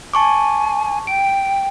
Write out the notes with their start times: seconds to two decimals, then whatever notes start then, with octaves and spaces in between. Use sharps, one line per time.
0.13 G#5 A5 C#6 D6
1.07 G5 D7